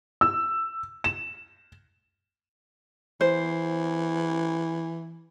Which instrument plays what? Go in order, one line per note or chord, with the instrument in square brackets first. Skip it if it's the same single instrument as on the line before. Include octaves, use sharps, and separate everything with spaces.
[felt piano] E6
E7
[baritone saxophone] E3 [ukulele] C5